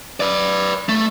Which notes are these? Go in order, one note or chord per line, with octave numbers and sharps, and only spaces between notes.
B4 D5
A3